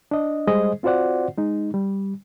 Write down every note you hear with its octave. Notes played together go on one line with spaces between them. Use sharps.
D4 D#5
G3 G#3 G#4 C5 D#5
C4 F4 F#4 C5 D5 F#5
G#3 D#4
G3